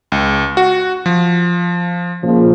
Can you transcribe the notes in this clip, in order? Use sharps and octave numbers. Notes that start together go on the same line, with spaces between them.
C#2
F#4
F3
A#2 C#3 F3